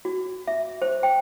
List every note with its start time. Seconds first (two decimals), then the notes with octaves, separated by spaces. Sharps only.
0.05 F#4
0.47 E5
0.82 C5
1.03 G5